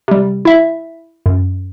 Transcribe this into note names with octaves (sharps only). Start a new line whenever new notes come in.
C3 G3
E4 E5
F#2